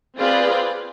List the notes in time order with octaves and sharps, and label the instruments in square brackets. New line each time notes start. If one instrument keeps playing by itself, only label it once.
[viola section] C4 F4 G#4 B4 D5